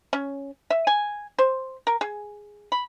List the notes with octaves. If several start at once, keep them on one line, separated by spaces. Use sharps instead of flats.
C#4
E5
G#5
C5
A#4
G#4
B5